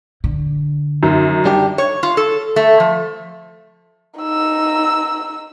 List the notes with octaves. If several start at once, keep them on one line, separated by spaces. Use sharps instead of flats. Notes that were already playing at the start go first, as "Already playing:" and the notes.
D3
F#2 D#4
G3 D4 G4
C#5
F4
A4
A3
F3
D#4 E6